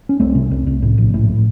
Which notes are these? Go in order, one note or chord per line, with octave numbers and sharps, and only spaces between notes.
C#4
C2 A3 C4
C3
C2
C2
A2
A#1
A2
A2